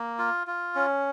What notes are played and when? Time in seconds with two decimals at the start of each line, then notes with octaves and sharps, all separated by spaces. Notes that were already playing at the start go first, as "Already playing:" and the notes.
Already playing: A#3
0.19 F4
0.47 F4
0.75 C#4